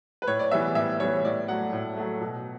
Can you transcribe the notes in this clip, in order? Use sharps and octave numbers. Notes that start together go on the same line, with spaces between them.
B4
A2 C#5
D5
E3 G3 B3 E5
A2 E5
E3 G3 B3 C#5
A2 D5
F#3 A3 F#5
A2
F#3 A3
B2